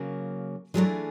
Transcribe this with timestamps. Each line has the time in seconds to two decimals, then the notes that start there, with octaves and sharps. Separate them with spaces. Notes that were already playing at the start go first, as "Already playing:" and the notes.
Already playing: C#3 F#3 A#3
0.74 E3 F#3 G#3 A3 D4 F4 G#4